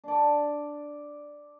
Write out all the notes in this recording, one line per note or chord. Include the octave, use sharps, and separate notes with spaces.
D4 D5